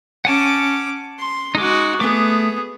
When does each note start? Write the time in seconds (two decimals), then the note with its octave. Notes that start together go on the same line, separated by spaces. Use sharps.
0.25 C#4 F#5 G#5 A5 D6
1.19 C6
1.55 G#3 D#4 F#4 D6
2.00 A3 B3 G#4 D6